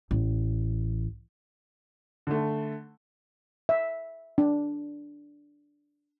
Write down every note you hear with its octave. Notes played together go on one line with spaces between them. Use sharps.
A1
D3 A3
E5
D4